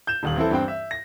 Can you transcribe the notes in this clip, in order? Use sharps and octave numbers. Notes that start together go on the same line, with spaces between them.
G6 E7
D#1 D#2 F#7
E3 C4 E4 A4
G2 C4 G5
E5
A#6